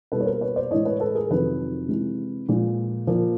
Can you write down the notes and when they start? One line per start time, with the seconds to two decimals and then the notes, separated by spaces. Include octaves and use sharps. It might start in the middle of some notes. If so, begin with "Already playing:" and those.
0.12 B2 G3 A#3 A4 B4
0.21 C#5
0.26 A#4 C5
0.41 B4 C#5
0.56 C5 D5
0.71 A2 E3 G#3 C#5 D#5
0.85 B4 C#5
1.00 A4 B4
1.15 G#4 A#4
1.30 F2 C3 D#3 F#3 A4 B4
1.89 C3 E3 G#3
2.49 A#2 F3 G#3
3.07 A#2 F3 A#3